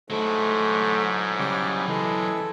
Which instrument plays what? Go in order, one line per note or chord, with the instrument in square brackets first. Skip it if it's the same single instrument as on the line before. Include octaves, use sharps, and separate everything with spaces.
[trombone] G#2 [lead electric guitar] F#3 E4 [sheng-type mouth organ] A3
[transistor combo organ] C#3 G3 [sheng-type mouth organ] D6
[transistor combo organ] E3 [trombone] G#3 [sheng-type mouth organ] A4